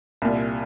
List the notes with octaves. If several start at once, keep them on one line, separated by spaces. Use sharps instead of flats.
C2 A#2 G3